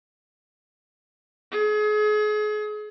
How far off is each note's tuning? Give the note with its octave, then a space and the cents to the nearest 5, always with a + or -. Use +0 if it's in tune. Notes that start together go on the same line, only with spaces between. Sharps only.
G#4 +35